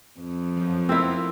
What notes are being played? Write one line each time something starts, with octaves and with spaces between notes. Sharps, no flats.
F2
F#2 F3
B3 C4 E4 F4 A#4